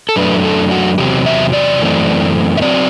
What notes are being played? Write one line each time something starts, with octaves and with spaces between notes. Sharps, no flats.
A4
F#2 F#3 A3 D4 B4
A4
F#4
E2 C3 F#3 C4 G4
E5
D5
F#2 E3 A3 C4
E5
F#3 C4 D5